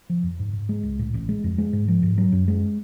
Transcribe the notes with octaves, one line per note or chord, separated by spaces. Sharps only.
F3
F2
G#2
G#2
G#3
C#2
A2
A1
G#3
F2
G#3
G#2
F3
G#2
F#3
F#2
G#3